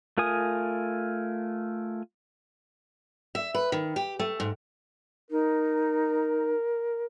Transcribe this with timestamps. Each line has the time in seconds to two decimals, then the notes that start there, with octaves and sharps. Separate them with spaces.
0.18 A3 F4 A#4 G#5 D#6
3.35 E5
3.55 B4
3.72 D#3
3.96 G4
4.19 A3
4.40 G#2
5.31 D#4 A#4